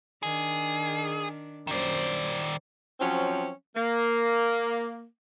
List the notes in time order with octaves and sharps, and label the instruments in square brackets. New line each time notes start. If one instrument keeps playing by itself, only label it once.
[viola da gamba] D#3 D4 [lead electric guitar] G#4
[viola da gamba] F#2 C5 [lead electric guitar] D#3 D5
[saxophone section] F3 F#3 C4 C#4
A#3